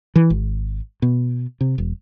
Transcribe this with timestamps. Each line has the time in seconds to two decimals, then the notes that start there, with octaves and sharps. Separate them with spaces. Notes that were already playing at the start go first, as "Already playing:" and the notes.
0.16 E3
0.30 G#1
1.02 B2
1.61 C3
1.78 E1